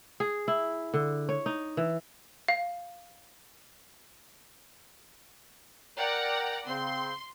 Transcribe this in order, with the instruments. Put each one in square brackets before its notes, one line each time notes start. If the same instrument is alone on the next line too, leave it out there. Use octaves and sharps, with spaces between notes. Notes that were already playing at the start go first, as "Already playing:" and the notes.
[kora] G#4
E4
D3
C#5
D#4
E3
[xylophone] F5
[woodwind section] A#4 G5 [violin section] D5 F#5 A#5
[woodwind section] C#3 C4 [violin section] C6